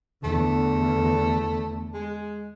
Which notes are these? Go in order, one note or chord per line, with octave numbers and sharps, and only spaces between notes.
E2 D3 A3
G#3